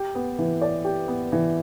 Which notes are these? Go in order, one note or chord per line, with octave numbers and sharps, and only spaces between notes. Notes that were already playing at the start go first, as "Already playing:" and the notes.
Already playing: G4
B3
E3
D5
G4
B3
E3